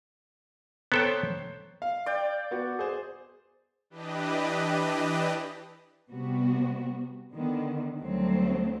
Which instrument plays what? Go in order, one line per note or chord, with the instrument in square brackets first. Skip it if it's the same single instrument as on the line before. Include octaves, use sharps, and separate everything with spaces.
[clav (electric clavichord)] B3 A4 G5 [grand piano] C5 C#5 A#5
[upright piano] F5
[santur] D5 G5
[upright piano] B3 F#4
G#4 C5
[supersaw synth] E3 D4 G4 B4 D#5
[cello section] C3 G3 B3 F#4
D3 D#3 B3
D2 F#3 G3 A3 C4